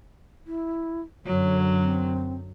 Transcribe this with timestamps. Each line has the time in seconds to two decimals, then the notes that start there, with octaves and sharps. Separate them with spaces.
0.47 E4
1.26 F#2 D3 F#3 C#5
1.81 C4